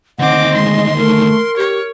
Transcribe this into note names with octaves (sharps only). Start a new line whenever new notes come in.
D2 D#3 C4 D#5 F#5 D6
G#3 C6
A3 A#4
G4 C#5